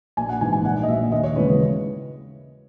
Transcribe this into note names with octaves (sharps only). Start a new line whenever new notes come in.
A#1 G#5
F#5
G#2 E3 G#3 G#5
G#5
A#1 F#5
D#5
A#2 F#3 E5
D#2 D#5
C#5
C#3 E3 G#3 B4
B4